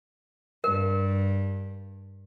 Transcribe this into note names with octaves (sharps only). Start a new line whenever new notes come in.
G2 A#4